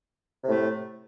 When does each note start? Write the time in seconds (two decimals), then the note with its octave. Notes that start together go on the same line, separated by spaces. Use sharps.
0.43 C3
0.47 A2
0.51 A3